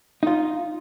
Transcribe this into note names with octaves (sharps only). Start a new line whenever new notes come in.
D#4 F4